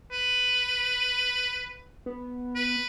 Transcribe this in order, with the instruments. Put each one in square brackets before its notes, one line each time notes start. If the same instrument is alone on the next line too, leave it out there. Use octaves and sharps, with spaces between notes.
[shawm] B4
[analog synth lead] B3
[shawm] B4